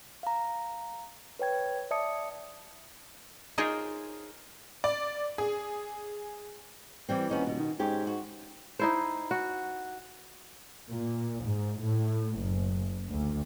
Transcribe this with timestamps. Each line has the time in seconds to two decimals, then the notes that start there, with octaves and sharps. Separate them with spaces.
0.23 F5 A#5
1.39 B4 C#5 G5 G#6
1.91 D5 E5 A5 D#6 C#7
3.58 D#4 F4 G#4 A#4 C5 C#5
4.84 D5
5.38 G#4
7.09 E3 G3 C4
7.29 D#1 B3 C#4 D#4
7.47 B2
7.60 D#3
7.79 G#2 C#4 G4 C#5
8.07 F#4
8.79 D#4 E4 C5
9.31 F#4
10.91 A#2
11.44 G#2
11.82 A2
12.39 F#1
13.09 D2